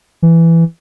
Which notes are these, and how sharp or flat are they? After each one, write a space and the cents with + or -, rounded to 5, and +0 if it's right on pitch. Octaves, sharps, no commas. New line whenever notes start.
E3 +10